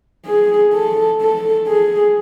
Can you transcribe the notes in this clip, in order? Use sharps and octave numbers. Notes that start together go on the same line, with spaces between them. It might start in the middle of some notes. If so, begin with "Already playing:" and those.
G#4
A4
A4
G#4